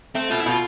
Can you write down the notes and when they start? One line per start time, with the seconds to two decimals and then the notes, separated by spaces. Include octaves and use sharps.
0.15 A3 C4
0.30 B2 F4
0.40 E4
0.46 B2 F4